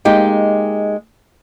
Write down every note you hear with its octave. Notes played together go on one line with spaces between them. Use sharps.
G#3 A#3 D#4 G4